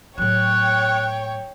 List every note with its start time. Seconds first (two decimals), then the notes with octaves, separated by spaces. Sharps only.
0.18 A2 F#3 C#5 G5 F#6